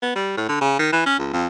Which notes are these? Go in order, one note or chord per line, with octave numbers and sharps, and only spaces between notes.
B3
G3
A2
D3
C#3
D#3
E3
C#4
C#2
F2